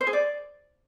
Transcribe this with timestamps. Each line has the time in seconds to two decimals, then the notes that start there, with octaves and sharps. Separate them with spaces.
0.01 C5
0.07 G#4
0.13 D5